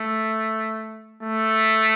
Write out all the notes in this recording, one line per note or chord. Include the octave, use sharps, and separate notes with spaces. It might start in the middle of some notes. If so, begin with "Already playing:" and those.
Already playing: A3
A3